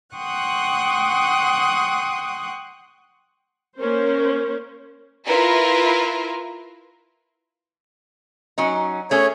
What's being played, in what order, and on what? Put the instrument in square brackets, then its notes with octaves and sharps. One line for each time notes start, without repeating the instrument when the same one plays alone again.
[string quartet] F#5 G5 C6 C#6 D#6 F#6
[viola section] A#3 C#4 A#4 C5
[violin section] E4 F4 A#4 B4
[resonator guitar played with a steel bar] F#3 C#4 D#4
[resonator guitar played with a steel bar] A3 C#4 G#4 [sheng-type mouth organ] C#5